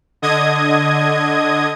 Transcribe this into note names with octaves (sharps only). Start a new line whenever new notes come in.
D3 D#5 D#6 G#6